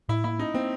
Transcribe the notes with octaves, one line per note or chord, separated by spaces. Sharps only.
A2 E4
A#3 E4
C#4 D#4
A#3 C4